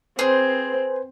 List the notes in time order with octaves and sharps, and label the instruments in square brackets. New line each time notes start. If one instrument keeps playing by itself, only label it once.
[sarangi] C4 [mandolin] G#4 [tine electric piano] B4 C5